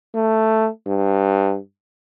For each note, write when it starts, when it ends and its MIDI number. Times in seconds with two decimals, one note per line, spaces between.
0.15 0.69 57
0.87 1.58 43